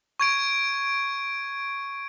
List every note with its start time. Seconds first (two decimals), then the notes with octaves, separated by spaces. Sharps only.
0.20 C#6 G#6 D7